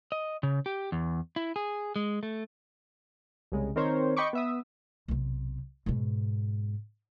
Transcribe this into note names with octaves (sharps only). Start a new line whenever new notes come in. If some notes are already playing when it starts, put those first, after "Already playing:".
D#5
C#3
G4
E2
E4
G#4
G#3
A3
C2 C#3 G#3
D#3 C4 A#4 C5 C#5
D#5 G5 B5 C#6 D6
B3 E5 D#6
B1 C3
G#2 B2